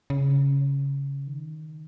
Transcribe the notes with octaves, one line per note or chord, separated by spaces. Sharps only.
C#3
D#3